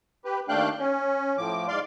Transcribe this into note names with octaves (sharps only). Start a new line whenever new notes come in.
G4 B4
D#2 A3 D4 F5 G5 F#6
C#4
A2 F3 D6
G#2 D5 F5 C6